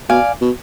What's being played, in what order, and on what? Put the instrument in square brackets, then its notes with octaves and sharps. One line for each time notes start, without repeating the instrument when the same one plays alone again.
[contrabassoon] B2 [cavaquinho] D5 F5 G#5
[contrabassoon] B2